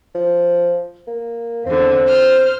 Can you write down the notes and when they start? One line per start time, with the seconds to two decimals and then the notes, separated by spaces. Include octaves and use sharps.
0.15 F3
1.07 A#3
1.66 E2 D3 C4
2.06 C5 F6